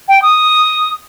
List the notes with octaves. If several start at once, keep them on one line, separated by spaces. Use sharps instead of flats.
G5
D#6